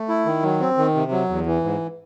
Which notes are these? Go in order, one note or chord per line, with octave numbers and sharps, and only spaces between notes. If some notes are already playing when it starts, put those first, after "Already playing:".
Already playing: A3
E4
D#3
F#3
C4
D#3
C3
F#3
E2
E3
G#2